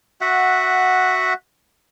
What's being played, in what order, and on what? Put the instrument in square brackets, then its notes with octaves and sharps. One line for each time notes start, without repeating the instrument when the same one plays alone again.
[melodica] F#4 E5 F#5